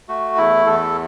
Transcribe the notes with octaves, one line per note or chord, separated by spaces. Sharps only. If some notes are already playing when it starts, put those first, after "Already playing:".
A3 F#4
E2 E4
E2 A4